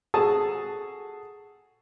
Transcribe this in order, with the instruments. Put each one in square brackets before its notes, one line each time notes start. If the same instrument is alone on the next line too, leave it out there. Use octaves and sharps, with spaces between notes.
[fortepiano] F#4 G#4 A4 A5 D#6